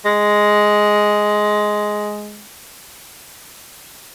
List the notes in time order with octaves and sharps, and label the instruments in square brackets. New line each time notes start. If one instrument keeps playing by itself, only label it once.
[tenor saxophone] G#3